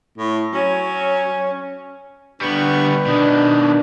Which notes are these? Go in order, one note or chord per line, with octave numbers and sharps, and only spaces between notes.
A2
F#3 C#4
D3 G3 B3 B4 C#6
B2 D#3 D4